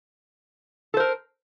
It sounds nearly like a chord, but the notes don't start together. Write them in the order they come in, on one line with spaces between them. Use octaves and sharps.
A4 C5 A#4